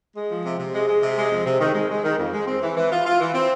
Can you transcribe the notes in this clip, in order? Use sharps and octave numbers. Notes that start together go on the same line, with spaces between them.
G#3
F3
C3
C3
G#3
G#3
C3
G#3
F2
C3
D#3
G#3
G#3
D#3
F2
G#3
C4
E3
E3
F4
F4
E3
C4